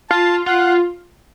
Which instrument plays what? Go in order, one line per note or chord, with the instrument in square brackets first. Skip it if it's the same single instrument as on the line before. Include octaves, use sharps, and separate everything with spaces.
[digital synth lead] F4 [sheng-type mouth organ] A5
[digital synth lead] F4 [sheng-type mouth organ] F#5